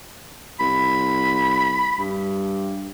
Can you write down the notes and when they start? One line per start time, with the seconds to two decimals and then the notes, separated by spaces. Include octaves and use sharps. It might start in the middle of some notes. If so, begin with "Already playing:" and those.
0.60 C2 B5
1.98 G2